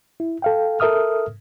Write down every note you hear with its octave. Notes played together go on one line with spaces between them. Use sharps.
E4
A4 F5 G5
A4 A#4 E5 D#6 F6